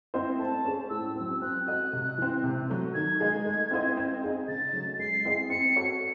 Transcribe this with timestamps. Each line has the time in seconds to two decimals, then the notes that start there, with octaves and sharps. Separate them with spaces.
0.14 C4 E4 C5 D#5
0.39 A3 A5
0.65 C#4 G#4 C5
0.90 A2 E6
1.16 F#3 C4
1.42 C4 F#6
1.66 F#4 A4 D#5
1.93 C3
2.18 E3 C4
2.44 C3
2.69 F#3 A3
2.94 D#3 G#6
3.20 G#3 D#4 G#4
3.45 A3
3.71 C4 E4 C5 D#5
3.97 C4
4.22 D#4 G#4 D#5
4.48 C#3 A6
4.73 F#3 A3 C#4
4.99 G#3 C7
5.25 C4 E4 G#4 D#5
5.50 C4 C#7
5.76 F#4 A4 C#5